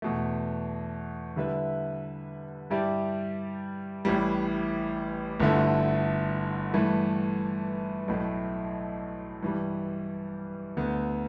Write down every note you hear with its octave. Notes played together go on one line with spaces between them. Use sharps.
E2 B2 A3
D3 G3 E4 B4 E5
G2 G3 E4 G4 D5
A1 A2 E3 G3
G1 G2 D3 A3 E4
G2 E3 A3
B1 A2 A3
G2 E3 G3
D2 D3 B3